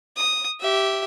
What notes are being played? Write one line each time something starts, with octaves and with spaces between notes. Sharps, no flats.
D#6
G4 E5